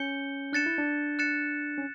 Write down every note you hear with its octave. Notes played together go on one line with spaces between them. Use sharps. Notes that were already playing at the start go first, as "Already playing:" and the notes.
Already playing: C#4 G6 C#7 G7
D4 F#6 A6 C#7 E7
E4
D4
F#6 A6 C#7 E7
C#4